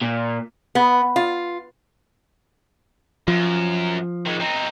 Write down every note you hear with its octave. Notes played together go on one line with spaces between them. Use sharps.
A#2
B3
F4
F#2 F3
D#3 G#3
C4 D#4